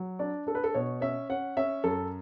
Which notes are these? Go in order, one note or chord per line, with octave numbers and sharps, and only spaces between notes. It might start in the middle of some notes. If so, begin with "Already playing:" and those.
Already playing: F#3
D4 D5
D4 A4
B4
A4
B2 C#5
C#4 E5
C#4 F#5
C#4 E5
F#2 A4